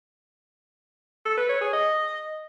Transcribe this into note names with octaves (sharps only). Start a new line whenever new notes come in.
A4
B4
C#5
G#4
D#5